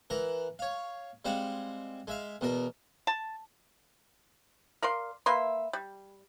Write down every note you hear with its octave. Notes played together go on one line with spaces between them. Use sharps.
E3 A#4 F#5
C#5 F5
G3 G#3 C4 F5 F#5
G#3 E5 F5
E2 B2 A#4
A5
A#4 D5 F5 C6
A#3 B4 E5 C6
G3